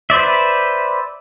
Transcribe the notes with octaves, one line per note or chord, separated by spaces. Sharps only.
B4 C5 D5 E5